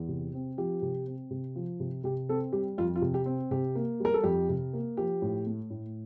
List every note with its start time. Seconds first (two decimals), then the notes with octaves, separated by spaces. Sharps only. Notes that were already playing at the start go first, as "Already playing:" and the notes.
Already playing: E2
0.08 C3
0.34 C4
0.58 F3 G4
0.82 C3
1.07 C4
1.30 C3
1.56 F3
1.80 C3
2.04 C3 G4
2.29 C4 A4
2.53 G3 G4
2.78 F2 F4
2.96 F4
3.01 C3
3.14 G4
3.26 C4
3.51 C3 G4
3.75 A#3
4.00 G3 A#4
4.14 A4
4.24 F2 G4
4.49 C3
4.73 A#3
4.97 F3 G4
5.22 A2
5.46 A3
5.70 A2